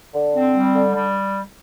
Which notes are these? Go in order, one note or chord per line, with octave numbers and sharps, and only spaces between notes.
D3
C4
G3
D3
G3